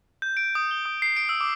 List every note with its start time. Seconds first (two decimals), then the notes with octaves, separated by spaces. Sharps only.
0.22 G6
0.37 D7
0.55 D#6
0.71 G7
0.86 D#6
1.02 C7
1.17 D7
1.29 E6
1.41 D6